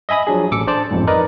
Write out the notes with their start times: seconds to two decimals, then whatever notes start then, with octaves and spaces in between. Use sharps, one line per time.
0.09 D#5 E5 G#5 B5 D#6
0.27 F3 F#3 D4 G#4
0.51 A1 A4 D6 E6 C#7
0.67 D4 C5 D5 A5
0.91 A1 F2 G#2
1.07 D#4 A#4 B4 D5 D#5